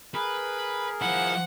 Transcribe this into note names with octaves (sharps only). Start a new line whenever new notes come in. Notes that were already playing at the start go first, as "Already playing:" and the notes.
G#4 A#4 B4
F3 E4 F#5